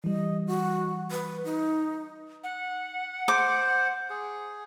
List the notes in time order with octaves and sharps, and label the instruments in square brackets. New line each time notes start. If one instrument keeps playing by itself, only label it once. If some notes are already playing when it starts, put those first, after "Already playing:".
[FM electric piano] E3 G3 [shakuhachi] D#5
[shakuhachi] F#4
B4
D#4
[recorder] F#5
[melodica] C5 [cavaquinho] D6
[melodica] G#4